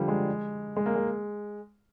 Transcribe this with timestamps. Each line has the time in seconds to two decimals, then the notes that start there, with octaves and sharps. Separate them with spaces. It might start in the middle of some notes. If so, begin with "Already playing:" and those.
Already playing: D3 F3 G3
0.08 G#3
0.76 G#3
0.86 A#3
0.96 G#3